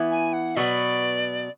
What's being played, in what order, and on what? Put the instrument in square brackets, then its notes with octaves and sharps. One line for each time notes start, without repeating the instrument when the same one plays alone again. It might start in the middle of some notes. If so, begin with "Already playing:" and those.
Already playing: [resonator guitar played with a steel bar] E3 B3 E4
[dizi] G#5
F#5
[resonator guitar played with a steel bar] B2 F#3 B3 [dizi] D5